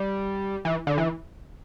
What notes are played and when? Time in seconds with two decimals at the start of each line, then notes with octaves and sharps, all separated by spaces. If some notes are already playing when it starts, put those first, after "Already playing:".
Already playing: G3
0.65 E3
0.87 D3
0.98 E3